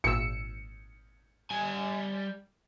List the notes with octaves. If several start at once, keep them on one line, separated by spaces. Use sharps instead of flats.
G#1 A#2 E6 C#7
G3 G#5